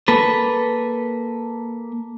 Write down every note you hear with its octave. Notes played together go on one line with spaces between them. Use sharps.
A#3 A4 B4